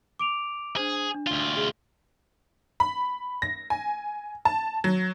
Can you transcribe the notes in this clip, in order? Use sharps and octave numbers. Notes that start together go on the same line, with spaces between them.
D6 D7 F7
D4 G#4 C5
D4
D2 F4
G#4
B5
A#6
G#5
A5
F#3